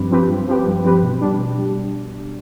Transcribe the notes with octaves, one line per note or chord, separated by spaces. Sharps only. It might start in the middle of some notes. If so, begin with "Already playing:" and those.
Already playing: G2 F3 C4 G4 B4
F3 C4 G4 B4
G2
F3 C4 G4 B4
G2
F3 C4 G4 B4
B2
G3 D4
B2
G3